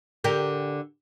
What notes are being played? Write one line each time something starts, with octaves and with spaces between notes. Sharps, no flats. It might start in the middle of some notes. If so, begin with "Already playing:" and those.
D3 G4 A#4